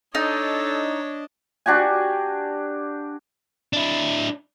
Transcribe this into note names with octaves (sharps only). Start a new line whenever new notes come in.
D4 D#4 A4 C#5 D#5
D4 F#4 G4 G#5
D4 E4